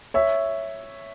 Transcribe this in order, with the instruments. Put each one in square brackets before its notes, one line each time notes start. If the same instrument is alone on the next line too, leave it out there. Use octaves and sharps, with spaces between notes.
[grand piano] C#5 E5